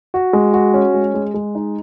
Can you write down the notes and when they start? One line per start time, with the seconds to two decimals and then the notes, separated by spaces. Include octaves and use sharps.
0.14 F#4
0.33 G#3
0.53 F#4
0.74 C#4
0.94 G#3
1.14 G#3
1.34 G#3
1.55 D#4